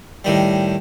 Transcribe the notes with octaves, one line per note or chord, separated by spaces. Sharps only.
A2 D#3 G3